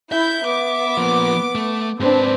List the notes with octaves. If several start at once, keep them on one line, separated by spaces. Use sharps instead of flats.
E4 E5 G6
B3 D6
F3 A#3
A3
G#2 C4 D4 B4